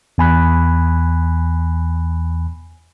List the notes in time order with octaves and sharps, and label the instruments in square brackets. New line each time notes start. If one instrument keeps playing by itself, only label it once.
[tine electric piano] E2 G#5 B5 F#6